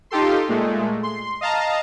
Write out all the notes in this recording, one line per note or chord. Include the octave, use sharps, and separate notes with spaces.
D#4 F4 G4 A4 C6
A#2 G#3 A3
C6
D#5 F5 A5 A#5